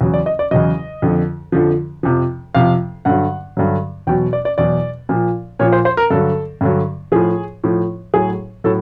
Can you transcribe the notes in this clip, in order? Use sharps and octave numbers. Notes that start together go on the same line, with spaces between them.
E2 C#3 F#3
D5
D#5
D5
E2 C#3 F#3 D#5
F2 D3 F3
F2 D3 F3
F2 C3 F3
F2 C3 F3 F5
G2 D3 F#3 F#5
G2 D3 F#3
E2 B2 F#3 G5
D5
D5
E2 B2 F#3 D5
A#2 F3
A#2 F3 C#5
C5
C5
A#4
G2 D3 F#3 A4
G2 D3 F#3
A2 F3 G#4
A2 F3
A2 F#3 G#4
A2 F#3 A4